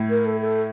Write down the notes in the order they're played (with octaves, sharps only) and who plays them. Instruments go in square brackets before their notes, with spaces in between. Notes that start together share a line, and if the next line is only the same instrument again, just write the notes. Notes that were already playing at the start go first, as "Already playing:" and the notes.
Already playing: [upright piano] A2
[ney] A#4
A4
A4